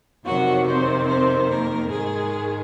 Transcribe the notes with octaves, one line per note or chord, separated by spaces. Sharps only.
F2 C3 D#3 F#3 F#4
C4 C5
C4 C5
A#3 A#4
G#2 D#3 G#3 G#4